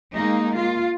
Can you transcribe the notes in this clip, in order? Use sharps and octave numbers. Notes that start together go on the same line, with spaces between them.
G#3 A#3 D#4
F4